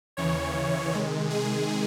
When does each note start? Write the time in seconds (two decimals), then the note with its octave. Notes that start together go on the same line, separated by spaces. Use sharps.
0.17 D#2 C#3 E3 C#5
0.92 C3 D#3 G#3
1.30 G#4